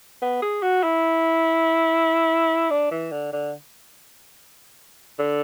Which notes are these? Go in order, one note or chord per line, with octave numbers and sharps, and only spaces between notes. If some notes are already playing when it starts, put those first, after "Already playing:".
B3
G#4
F#4
E4
D4
E3
D3
D3
D3